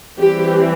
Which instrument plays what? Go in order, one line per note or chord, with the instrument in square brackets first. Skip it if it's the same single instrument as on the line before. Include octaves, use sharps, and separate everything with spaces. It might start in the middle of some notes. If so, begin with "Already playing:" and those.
[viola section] E3 G3 C4 G4